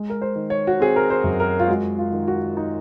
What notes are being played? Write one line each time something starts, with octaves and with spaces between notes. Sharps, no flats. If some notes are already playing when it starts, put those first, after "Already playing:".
Already playing: G#3
A#4
C5
D#3
C#5
F#4
C4 G#4
A#4
C5
F#2
A#4
F4
G#3 F#4
F4
D#3
F#4
D#4